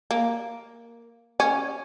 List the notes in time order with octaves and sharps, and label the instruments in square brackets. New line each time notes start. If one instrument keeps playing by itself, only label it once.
[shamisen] A#3
C#4